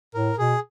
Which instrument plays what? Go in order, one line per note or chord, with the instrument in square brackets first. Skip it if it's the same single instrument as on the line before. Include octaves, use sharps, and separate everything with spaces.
[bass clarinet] A2 [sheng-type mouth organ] A#4
[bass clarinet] B2 [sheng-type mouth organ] G#4